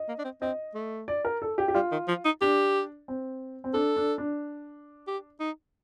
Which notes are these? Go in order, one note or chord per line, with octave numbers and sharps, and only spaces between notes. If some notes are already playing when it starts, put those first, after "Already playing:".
Already playing: D#5
A#3
D4
C4
C4 D#5
A3
D5
A#4
A4
G4
G4
G3 F4
D#3
F3
D#4
D4 G4
C4
C4
D4 A4
D4
D4
G4
D#4